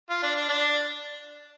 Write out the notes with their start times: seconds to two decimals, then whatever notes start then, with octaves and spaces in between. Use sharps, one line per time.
0.10 F4
0.23 D4
0.36 D4
0.48 D4